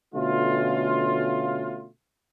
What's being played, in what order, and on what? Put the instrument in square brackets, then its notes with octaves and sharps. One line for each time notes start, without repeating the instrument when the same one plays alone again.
[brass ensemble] B2 D3 A3 C#4 F4